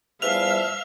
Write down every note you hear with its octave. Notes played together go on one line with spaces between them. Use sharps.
E2 F3 G3 E5 F5 F6 F7